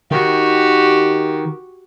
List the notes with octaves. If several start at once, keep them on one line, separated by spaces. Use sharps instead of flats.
D#3 F#4 G4